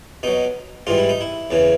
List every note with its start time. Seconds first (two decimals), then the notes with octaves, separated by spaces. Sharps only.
0.23 B2 F#3 D#4
0.87 G#2 E3 G3 F4
0.98 E4
1.09 D#4
1.21 E4
1.51 E2 C#3 E3